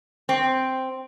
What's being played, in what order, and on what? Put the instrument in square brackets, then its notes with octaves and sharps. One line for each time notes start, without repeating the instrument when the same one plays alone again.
[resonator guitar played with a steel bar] C4